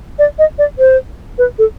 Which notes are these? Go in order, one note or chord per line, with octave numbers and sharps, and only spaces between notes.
D5
D#5
D5
C5
B4
A4